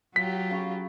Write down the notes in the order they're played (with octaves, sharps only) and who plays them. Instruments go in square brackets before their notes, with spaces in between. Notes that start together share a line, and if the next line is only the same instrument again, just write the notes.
[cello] F#3 [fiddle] F4 G4 [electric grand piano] B6
[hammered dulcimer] C#3 B5 C#6